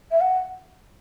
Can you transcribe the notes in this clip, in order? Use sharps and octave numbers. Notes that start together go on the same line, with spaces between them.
E5
F#5